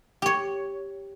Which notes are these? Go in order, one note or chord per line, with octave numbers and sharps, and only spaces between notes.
G4 C#5